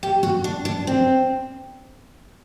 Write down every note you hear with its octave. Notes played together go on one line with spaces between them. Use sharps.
G4
F#4
D4
D4
C4